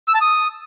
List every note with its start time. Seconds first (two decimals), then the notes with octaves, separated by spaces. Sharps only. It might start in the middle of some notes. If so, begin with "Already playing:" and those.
0.08 E6
0.15 A5
0.21 D#6